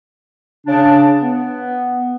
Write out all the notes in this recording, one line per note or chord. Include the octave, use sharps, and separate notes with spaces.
C#3 D4
B3